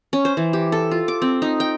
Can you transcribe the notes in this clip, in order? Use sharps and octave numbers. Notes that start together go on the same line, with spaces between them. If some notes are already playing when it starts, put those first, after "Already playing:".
C#4
C5
E3
G4
A4
F4
D6
C4
D#4
G5